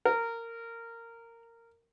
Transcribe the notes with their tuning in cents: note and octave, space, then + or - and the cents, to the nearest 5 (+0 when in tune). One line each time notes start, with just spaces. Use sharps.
A#4 -15